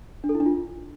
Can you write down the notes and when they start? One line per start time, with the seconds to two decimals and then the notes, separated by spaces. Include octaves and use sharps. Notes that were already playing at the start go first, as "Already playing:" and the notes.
0.24 D4
0.29 A4
0.35 E4
0.40 D4
0.46 F4